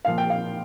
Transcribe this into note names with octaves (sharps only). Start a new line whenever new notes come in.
A#2 F3 F5
G5
F5